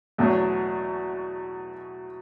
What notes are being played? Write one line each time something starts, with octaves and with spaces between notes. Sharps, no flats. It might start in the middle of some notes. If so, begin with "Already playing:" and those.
E2 B2 F#3 A3